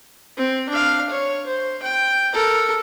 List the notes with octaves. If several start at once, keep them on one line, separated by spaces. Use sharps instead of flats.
C4
D4 F5
C#5
C5
G5
A4 A#4